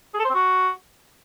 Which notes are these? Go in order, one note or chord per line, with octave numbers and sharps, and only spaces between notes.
G#4
A4
C5
C4
F#4